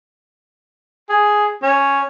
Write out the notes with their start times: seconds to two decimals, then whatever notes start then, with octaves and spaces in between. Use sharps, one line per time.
1.10 G#4
1.63 C#4